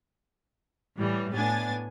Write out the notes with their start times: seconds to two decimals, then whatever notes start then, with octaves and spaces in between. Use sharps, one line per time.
0.97 A2 E3 G3
1.33 A2 B3 D4 G#5 A6